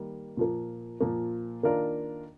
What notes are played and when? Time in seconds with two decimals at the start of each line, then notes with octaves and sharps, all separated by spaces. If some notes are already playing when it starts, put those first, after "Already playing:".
Already playing: D#3 G3 A#3
0.37 A#2 F3 A#3
1.01 A#2 F3 A#3
1.63 D#3 A#3 D4 F4 A#4